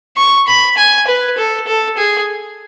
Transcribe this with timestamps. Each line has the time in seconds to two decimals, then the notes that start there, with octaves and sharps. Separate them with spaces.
0.17 C#6
0.48 B5
0.77 G#5
1.08 B4
1.38 A4
1.67 A4
1.98 G#4